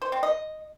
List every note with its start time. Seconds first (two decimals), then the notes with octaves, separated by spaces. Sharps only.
0.02 C5
0.12 C4
0.23 D#5